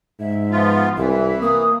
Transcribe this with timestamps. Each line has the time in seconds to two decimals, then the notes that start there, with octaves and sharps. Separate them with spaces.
0.20 G#2 E5
0.51 F3 B3 F4
0.97 C2 E3 E5
1.42 A#3 D#6